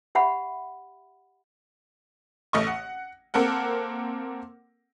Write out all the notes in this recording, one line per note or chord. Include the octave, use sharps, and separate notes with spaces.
G4 E5 F#5 B5
A1 A3 D#5 C#6
F#5
A#3 C4 A4 A#4 F#5